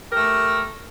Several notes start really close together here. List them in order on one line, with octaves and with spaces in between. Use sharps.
G4 A#4 A3